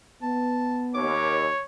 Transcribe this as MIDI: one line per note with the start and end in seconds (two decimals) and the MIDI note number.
0.22 1.11 59
0.22 0.89 81
0.95 1.49 39
0.95 1.64 73
0.95 1.37 86